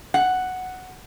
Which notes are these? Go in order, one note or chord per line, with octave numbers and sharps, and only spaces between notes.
F#5